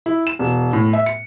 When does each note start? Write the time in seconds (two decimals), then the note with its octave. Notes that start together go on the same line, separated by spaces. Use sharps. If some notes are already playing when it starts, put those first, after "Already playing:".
0.06 E4
0.27 E7
0.39 E1
0.73 A2
0.93 E5
1.06 C#7